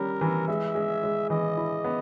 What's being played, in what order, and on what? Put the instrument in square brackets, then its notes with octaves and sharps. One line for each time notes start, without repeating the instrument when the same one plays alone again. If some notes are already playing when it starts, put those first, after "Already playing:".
Already playing: [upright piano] G3 C#4 [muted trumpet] A#4
[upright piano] E3
[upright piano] G#3 [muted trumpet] E5
[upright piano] G#3
G#3
[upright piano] E3 [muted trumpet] D#5
[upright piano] E4
B3